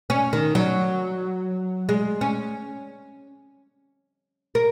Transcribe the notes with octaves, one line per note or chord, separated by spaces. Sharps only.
C#4
D#3
F#3
G#3
C#4
A#4